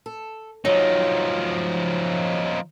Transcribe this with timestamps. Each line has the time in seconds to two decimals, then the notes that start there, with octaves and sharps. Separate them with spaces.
0.06 A4
0.65 F3 F#3 D#4